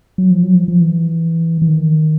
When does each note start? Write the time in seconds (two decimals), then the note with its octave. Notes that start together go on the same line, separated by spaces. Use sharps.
0.18 F#3
0.31 F3
0.43 F#3
0.55 F3
0.68 F3
0.81 E3
1.62 E3
1.67 D#3